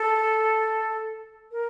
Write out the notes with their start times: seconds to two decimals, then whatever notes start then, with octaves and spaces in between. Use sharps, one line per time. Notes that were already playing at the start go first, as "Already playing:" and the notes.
Already playing: A4
1.51 A#4